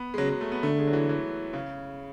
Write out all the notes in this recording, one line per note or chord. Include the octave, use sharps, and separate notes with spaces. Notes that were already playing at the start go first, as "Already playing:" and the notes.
Already playing: B3
G#3
C#3 F#3
F#3
A3
B3
D3 A3
G#3
F#3
E3
E3
C#3